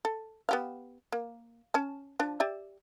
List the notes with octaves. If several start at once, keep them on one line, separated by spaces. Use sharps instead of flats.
A4
B3 G4 F5
A#3
C#4 A5
F3 D4
G4 D5 E5